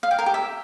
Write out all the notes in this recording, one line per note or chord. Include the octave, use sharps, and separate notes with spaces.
F5
G5
A#4
G4
E5